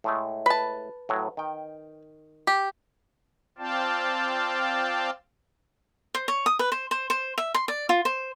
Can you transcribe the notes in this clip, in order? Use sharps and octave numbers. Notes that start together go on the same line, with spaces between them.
A2 G#3 A3
B4 A5
A2 F#3
D#3 G5
G4
C4 F4 D5 F5 G5 A5
C5
C#5
D#6
B4
C5
C5
C5
E5
C6
D5
F4
C5